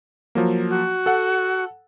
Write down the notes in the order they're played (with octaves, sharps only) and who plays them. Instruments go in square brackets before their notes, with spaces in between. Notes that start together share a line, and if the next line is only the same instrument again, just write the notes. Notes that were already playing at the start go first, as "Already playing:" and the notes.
[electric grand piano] F3 F#3 A#3
[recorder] F#4
[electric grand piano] A4 F#5